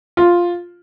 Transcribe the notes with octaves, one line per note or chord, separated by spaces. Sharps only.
F4